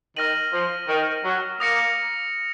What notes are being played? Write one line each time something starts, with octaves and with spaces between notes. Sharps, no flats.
D#3 F6 A#6 D#7 F#7
F3
D#3
F#3
A#3 D#6 A#6 C#7